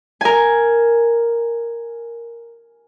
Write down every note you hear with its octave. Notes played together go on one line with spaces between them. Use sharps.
A#4 G#5